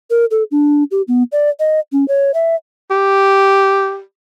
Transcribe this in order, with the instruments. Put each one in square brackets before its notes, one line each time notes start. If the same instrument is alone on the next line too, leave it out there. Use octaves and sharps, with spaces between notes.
[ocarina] A#4
A4
D4
G4
B3
D5
D#5
C#4
C#5
E5
[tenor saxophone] G4